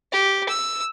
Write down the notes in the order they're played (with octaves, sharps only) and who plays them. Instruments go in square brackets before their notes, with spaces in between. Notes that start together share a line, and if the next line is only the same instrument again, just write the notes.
[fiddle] G4
E6